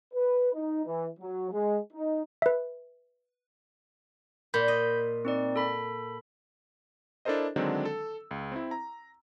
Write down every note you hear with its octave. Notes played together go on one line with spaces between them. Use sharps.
B4
D#4
E3
F#3
G#3
D#4
B4 E5
A#2 B5 G6 B6
D#5
C4 D#4 D5
A4 B5 B6
D4 E4 A4 A#4 C5 D#5
D3 D#3 F#3 G#3 C4 D4
A4 E6
C#2
C4 E4
A#5